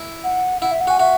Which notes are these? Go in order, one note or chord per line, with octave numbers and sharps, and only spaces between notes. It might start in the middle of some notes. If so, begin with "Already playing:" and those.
Already playing: E4
F#5
E4 F#5
E5
F#5
F#4 G#5
F#4 E5